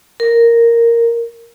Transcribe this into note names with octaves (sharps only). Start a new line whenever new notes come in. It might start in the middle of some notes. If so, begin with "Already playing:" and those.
A#4